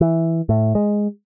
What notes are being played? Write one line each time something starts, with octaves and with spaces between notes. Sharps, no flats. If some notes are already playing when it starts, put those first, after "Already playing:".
E3
A2
G#3